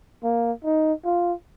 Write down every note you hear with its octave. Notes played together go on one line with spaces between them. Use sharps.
A#3
D#4
F4